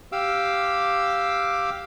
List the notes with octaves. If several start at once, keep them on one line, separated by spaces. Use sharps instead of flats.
G4 F5 D6 E6